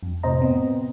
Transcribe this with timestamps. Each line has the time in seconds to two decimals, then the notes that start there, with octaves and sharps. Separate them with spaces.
0.03 F2
0.23 A2 C3 C5 D#5 A#5
0.41 B3 C4